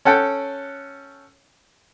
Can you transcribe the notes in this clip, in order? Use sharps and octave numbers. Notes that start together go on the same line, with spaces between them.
C#4 A4 F#5 G5